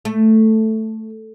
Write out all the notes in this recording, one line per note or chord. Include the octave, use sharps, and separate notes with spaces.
A3